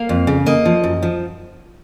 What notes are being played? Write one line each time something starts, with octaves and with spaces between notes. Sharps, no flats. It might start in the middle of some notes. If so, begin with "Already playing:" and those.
Already playing: A#3 F5
F2
C#3
A#3 D#5
F3
F#2
F3